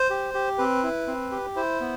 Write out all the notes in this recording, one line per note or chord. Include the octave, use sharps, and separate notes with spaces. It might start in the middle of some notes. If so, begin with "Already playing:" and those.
Already playing: C5
G4
G4
C4 B4
E4
C4
G4
E4 C5
B3